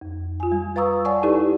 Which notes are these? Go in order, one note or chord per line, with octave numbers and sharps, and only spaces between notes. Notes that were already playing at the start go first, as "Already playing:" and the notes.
F2
F4 G#5
G3
B4 F5 A#5 C#6 D#6 E6
C#5 D5 F#5 G#5 A5 C#6
D#4 E4 G4 A4 B4 D5